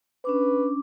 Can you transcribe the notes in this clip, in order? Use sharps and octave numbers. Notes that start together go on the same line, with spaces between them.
C#4 D4 B4 D6